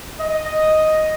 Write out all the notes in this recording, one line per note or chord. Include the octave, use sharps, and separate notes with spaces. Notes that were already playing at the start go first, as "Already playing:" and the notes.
D#5